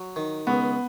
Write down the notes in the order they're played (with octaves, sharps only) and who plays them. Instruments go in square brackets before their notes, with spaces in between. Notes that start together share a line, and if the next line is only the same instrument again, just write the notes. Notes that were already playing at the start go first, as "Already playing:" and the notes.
Already playing: [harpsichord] F#3
D#3
[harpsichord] C#2 [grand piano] B3